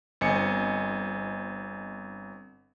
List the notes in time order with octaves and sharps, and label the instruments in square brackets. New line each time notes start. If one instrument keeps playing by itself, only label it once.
[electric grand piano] G1 C4 D#5 G#5 C#7